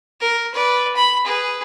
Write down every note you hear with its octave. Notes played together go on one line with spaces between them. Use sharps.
A#4
B4 D5
B5
G#4 B4